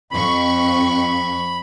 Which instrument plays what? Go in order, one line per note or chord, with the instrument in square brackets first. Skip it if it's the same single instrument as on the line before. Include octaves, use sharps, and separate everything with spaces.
[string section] F2 C#6 [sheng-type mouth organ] B5